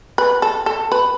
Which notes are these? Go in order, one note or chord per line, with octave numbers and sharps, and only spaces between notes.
B4
A4
A4
B4